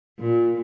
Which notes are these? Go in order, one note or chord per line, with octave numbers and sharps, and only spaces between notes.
A#2